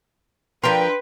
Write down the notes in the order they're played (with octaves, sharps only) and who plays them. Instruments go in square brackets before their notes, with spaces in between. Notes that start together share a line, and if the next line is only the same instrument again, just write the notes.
[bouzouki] F3 A#4 [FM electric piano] D4 C6 [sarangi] B4 [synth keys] G5